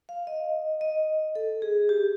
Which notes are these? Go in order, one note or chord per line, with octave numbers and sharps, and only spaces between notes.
F5
D#5
D#5
A4
G#4
G4